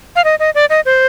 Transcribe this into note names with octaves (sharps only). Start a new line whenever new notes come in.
F5
D#5
D#5
D5
D#5
C5